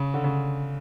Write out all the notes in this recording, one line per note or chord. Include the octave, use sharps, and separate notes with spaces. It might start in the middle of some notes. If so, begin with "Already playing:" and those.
Already playing: C#3
D3
C#3